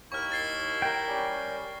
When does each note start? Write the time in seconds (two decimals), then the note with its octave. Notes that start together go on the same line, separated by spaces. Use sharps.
0.12 D#2 E4 C#6 F6
0.32 A6 C7 G7
0.82 A#4 G5
1.08 G3 C#4 D5